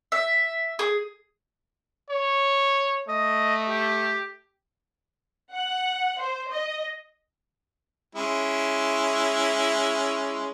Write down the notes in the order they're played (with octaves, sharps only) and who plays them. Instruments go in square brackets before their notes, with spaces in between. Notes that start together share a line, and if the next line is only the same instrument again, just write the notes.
[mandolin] E5
G#4
[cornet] C#5
[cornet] A3 [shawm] D#5
[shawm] G4
[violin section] F#5
C5
D#5
[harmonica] G#3 C#4 E4